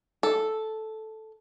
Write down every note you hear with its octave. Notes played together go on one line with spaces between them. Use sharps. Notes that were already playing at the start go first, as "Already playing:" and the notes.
A4